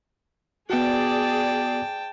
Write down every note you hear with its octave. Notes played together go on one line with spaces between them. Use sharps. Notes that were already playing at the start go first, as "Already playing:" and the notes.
B3 F#4 G#4 D5 G5 A5